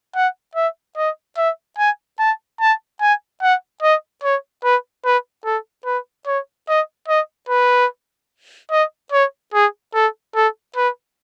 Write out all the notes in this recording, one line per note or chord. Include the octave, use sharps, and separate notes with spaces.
F#5
E5
D#5
E5
G#5
A5
A5
G#5
F#5
D#5
C#5
B4
B4
A4
B4
C#5
D#5
D#5
B4
D#5
C#5
G#4
A4
A4
B4